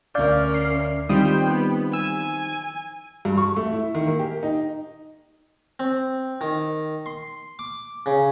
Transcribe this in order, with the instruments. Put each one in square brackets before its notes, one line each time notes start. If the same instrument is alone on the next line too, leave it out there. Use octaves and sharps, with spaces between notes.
[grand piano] D2 G6 [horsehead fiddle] C#4 A#4 [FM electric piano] D5 F5
[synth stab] C7
[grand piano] D#3 C4 F4 [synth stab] G3 [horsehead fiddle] C5 G5 [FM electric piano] D#6
[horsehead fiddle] B3
[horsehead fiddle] G#5 [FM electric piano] E6
[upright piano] G2
C#6
A3
E4
D#3
A#3
G4
D#4
[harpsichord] C4
D#3
C6
D6
C#3